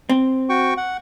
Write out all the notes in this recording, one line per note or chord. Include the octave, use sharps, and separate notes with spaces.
C4
F#4 G5 C#6
F#5